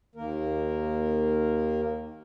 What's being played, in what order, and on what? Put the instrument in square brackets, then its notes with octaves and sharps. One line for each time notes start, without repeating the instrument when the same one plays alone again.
[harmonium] D#2 D#3 A#3 A#4